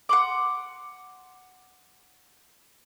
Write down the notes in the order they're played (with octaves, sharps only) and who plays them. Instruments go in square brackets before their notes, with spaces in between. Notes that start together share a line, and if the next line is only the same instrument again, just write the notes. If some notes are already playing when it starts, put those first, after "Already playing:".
[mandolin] F#5 C6 D6